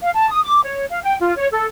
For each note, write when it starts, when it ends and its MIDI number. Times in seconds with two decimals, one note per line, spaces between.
0.01 0.09 77
0.14 0.28 81
0.30 0.43 87
0.43 0.60 86
0.63 0.85 73
0.90 0.98 77
1.02 1.16 79
1.20 1.34 65
1.36 1.47 73
1.51 1.66 69